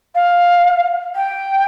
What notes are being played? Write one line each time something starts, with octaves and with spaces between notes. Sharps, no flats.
F5
G5